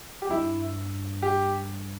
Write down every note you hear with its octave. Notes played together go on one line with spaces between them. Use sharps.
G4
G2 E4
G4